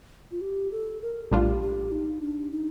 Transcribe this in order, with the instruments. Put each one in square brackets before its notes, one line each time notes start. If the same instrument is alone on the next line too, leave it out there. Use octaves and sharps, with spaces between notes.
[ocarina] F4
G4
A4
A#4
[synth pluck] A#1 A2 G3 D4 F4 [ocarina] G4
[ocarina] G4
D#4
D4
D#4